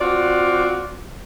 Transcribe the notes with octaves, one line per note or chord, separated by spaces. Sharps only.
C4 F4 F#4 D5